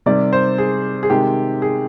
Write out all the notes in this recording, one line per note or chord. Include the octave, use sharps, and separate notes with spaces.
C3 D#3 G3 D5
C5
G#4
G#4
C3 D#3 G#3 G4
G#4